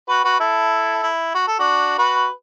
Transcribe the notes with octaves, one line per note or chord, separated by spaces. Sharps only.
F#4 B4
F#4 B4
E4 A4
E4
F#4
A4
D4 F#4
F#4 B4